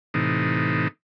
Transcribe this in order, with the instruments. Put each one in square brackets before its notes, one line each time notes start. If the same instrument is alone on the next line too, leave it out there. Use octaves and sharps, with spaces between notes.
[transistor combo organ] A2 C3 E3 D#4